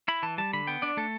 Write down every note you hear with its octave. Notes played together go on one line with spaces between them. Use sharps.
E4 B5
E3 A5
G3 A5
D3 B5
B3 G5
D4 D5
A3 A4